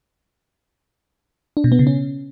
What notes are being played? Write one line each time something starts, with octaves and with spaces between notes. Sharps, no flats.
D4
B2
B3
C#3
C#4